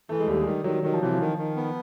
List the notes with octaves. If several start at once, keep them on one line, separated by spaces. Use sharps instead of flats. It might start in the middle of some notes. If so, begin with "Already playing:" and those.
E3 A3
G#3
D#2 G3
G#3
D#3 G3
D#3 F#3
D#3 F#3
F3
C3 E3
F3
D#3
D#3
B3